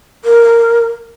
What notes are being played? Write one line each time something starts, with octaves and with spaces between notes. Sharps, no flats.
A#4